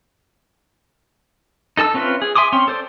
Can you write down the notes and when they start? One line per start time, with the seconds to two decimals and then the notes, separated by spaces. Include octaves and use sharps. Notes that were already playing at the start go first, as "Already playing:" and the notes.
1.77 D#4 A4 A5 E6
1.94 C4 C#4 F4 B4 E5
2.22 G#4
2.35 E5 G#5 C6 D6 D#6
2.52 C4 C#4 C6
2.68 A4 C5 D5